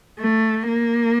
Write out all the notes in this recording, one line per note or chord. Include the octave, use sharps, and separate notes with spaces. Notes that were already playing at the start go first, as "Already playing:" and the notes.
A3
A#3